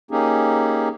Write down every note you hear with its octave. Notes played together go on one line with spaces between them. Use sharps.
A#3 C#4 D#4 G4 G#4